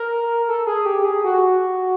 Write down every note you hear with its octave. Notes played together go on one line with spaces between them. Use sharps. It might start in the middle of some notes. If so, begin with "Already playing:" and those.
Already playing: A#4
A4
G#4
G4
G#4
F#4